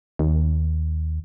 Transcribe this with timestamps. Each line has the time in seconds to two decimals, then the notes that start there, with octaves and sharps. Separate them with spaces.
0.19 D#2